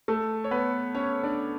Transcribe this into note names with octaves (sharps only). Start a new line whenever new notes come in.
A3 A4
C#5
B3 B4
C#4 C#5
D4 D5